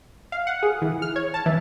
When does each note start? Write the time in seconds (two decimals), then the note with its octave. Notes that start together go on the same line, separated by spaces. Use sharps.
0.32 F5
0.47 F#5
0.63 G#4
0.82 E3
1.02 F6
1.16 C#5
1.34 A5
1.46 E3